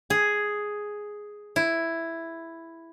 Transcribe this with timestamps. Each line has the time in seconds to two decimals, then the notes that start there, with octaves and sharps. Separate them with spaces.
0.10 G#4
1.56 E4